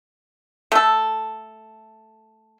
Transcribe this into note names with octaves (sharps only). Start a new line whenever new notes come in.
A3 A4